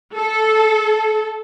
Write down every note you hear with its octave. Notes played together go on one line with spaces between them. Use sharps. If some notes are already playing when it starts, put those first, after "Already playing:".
A4